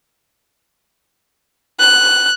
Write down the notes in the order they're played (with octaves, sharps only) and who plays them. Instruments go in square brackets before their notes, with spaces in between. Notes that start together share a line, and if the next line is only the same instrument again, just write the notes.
[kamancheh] F#6